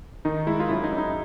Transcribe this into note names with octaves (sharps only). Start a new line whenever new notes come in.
D#3 D#4
G#3 E4
F4
F#2 E4
D#4
F#2
D#4